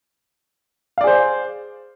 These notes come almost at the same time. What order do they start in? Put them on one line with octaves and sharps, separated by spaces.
F5 D5 G#4 C5